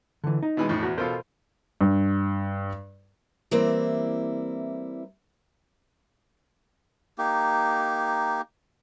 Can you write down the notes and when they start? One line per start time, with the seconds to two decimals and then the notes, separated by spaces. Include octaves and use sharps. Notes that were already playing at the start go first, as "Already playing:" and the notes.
0.24 D3 E3
0.43 D#4
0.57 B2 E3 G#3
0.69 F2 A2
0.83 E2 F#4
0.98 B2 F4 A4 A#4 C5
1.81 G2
3.51 E3 G3 A#3 C4 E4
7.18 A#3 D#4 G4